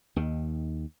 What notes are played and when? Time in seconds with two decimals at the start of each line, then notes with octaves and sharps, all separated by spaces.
0.16 D#2 D#3